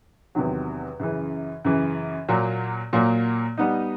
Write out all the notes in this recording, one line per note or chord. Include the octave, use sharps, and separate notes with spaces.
E2 C3 D#3 F#3
F#2 C#3 E3
F#2 C#3 E3
A#2 F#3 A#3
A#2 F#3 A#3
G3 B3 D#4